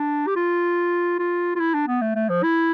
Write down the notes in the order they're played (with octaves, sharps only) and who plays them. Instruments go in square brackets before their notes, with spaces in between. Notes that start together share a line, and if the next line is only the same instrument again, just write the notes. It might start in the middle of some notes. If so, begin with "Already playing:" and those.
Already playing: [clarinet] D4
G4
F4
F4
F4
E4
D4
B3
A3
A3
F3
E4